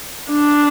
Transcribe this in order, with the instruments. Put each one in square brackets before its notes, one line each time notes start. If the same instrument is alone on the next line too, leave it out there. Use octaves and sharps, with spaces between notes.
[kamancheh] D4